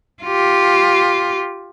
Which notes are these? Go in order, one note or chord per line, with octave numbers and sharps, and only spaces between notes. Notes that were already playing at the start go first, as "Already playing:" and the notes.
F4 G4